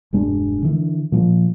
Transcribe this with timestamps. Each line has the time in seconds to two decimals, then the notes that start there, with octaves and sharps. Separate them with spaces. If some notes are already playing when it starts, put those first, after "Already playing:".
0.13 E1 G2 G#3 D4
0.62 D3 E3
1.12 A#2 F3